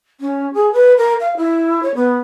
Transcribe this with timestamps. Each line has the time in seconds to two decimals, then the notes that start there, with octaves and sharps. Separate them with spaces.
0.20 C#4
0.54 G#4
0.73 B4
0.97 A#4
1.20 F5
1.37 E4
1.83 C#5
1.95 B3